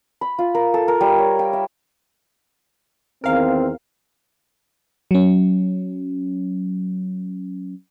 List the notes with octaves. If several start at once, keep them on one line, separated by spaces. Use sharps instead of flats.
B5
F4
A#4
A4
A#4
G3
C#5
G5
E5
E2 D#3 C4 A#4 F5
F#3 C#4